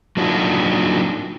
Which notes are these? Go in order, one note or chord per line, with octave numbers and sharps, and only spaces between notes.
F#3 A#3 D4 D#4 F4 F#4